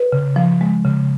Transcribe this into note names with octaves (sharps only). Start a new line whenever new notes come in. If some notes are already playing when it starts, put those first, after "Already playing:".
Already playing: B4
C#3
F3
G#3
C#3